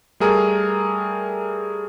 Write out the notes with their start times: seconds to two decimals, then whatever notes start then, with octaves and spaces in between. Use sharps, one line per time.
0.20 G3 A3 G#4 A#4